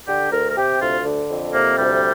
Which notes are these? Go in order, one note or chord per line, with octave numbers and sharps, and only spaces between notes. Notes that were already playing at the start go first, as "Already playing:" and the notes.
D3 G4
D2 A#4
A#4
C3 G4
D2 F4
D3
F2
C3 A#3
D2 G3